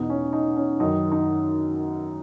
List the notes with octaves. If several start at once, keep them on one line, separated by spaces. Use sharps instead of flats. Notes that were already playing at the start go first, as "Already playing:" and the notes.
Already playing: E2 B2 D#4
C#4
D#4
C#4
F#2 D#3 D#4
D#4